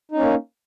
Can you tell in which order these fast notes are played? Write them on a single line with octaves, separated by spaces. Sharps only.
D#4 C#4 A#3